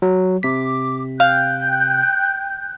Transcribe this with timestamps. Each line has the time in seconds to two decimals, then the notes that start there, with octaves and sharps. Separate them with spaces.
0.02 F#3
0.43 C3 D6 B6
1.20 F5 G5 F#6 G6